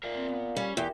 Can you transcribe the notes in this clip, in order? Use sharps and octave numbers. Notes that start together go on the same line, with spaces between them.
A#2 A#4 E5 F5
C4
B3 F5
G3 C#4
E2 G4 A#4 E5 G5